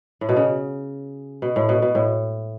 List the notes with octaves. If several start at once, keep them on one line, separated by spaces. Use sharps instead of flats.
A2
B2
C#3
B2
A2
B2
B2
A2